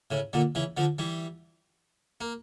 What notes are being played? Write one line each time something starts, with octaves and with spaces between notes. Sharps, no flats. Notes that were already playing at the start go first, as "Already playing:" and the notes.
A2 C#3
A#2 D3
C#3 E3
D3 F3
E3 G3
A#3